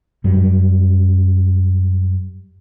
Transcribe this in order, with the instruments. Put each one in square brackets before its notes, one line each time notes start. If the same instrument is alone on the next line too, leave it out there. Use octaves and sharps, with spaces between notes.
[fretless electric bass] F#2 F#3 G3